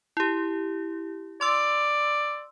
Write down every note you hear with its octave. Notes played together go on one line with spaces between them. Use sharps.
E4 G4
D5 C6 E6